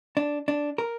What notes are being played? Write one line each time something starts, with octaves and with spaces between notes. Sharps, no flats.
D4
D4
A#4